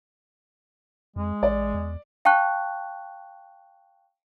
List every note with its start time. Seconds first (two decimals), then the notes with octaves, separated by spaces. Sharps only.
1.16 F2 G#3
1.43 A1 D5
1.74 E2
2.25 F5 G5 A5 C#6 F#6